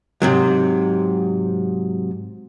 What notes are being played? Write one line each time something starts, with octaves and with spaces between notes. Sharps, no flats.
G#2 C3 F#3